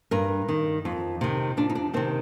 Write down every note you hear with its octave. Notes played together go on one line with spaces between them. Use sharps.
G2 A#4
D#3
F2
C3 D#3
F2 D4
D#4
D4
C3 D#3 C4